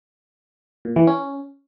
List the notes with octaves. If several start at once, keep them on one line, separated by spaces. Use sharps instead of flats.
A#2
E3
C#4